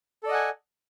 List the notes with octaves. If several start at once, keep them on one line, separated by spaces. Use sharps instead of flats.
A4 D5 D#5 F#5 G#5